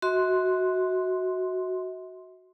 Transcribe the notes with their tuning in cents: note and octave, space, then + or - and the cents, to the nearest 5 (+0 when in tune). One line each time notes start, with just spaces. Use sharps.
F#4 +0 E5 -45 C6 +0